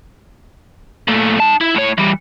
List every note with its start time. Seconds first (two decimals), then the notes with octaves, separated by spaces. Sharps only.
1.08 A#2 A3
1.40 D#4 A5
1.61 E4
1.75 A2 C#5
1.98 E3 G3